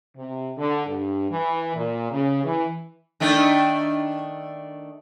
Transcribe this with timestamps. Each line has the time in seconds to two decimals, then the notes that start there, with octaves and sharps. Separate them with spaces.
0.16 C3
0.57 D3
0.87 G2
1.29 E3
1.75 A#2
2.11 C#3
2.44 E3
3.20 D#3 A3 D4